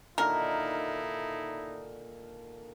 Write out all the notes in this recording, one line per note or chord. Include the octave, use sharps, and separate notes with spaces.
A#2 D3 D#3 D#4 E4 A#4